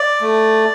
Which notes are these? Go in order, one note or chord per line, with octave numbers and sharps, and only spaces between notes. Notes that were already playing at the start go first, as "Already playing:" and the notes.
Already playing: D5
A3